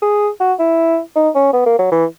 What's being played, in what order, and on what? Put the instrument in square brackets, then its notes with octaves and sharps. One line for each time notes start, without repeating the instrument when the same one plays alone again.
[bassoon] G#4
F#4
E4
D#4
C#4
B3
A#3
F#3
E3